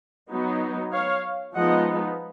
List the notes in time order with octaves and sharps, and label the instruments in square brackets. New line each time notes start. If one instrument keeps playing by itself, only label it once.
[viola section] F#3 B3 D#4
C#5 F5
F3 G#3 B3 D#4 D#5 F#5